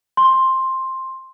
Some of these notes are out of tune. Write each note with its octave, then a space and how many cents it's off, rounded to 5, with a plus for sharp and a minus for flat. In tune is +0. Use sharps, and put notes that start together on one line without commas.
C6 +10